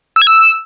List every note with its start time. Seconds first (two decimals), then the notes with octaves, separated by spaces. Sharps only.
0.16 E6
0.22 G#6
0.27 E6